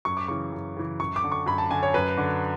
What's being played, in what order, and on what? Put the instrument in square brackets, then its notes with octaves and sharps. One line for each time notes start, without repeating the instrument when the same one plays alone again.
[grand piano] F#2 C#6
D6
C#3 E3 C#6
F#2
C#3 E3
F#2 C#6
D6
D3
C#6
F#2 B5
A5
D3 G#5
C#5
F#2 B4
D3